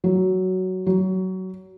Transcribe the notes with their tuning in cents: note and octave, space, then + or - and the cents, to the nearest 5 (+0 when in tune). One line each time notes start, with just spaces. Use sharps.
F#3 +10
F#3 +20